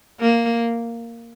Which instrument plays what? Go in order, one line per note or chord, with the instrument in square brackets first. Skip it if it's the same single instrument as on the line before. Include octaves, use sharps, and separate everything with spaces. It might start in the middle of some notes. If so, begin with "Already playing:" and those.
[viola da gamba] A#3